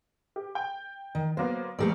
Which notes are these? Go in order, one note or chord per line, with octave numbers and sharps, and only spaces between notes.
G4
G5
D#3
F#3 A#3 B3 C5
A#1 G3 A3 A#3 D5